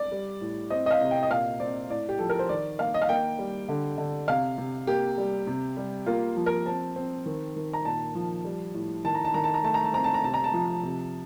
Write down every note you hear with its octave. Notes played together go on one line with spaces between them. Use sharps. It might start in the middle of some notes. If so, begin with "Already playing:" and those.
Already playing: D5
G3
A2
C4 D#5
D#5
F5
C3
G5
D#5
A#2 F5
C4 D5
A2 D5
G4
F3 A4
A#4
C5
D#3 D5
A#3 F5
D#5
F5
A#3 G5
G3
D3
D3
C3 F5
C3
A#3 G4
G3
C3
G3
A#3 F4
F3
A#4
C4 A5
C4
D#3
D#3
A#5
A#2 A5
F3
G3
A2
D#3 A5
A#5
A5
D#3 A#5
A5
A#5
A3 A5
A#5
A5
C4 A#5
A5
A#5
C3 A5
A#5
A5
F3
C3